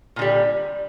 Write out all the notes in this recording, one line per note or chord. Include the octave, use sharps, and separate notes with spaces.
A#2 D3 G3